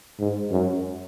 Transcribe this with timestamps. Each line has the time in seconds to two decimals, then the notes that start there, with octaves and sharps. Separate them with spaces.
0.19 G#2
0.51 F#2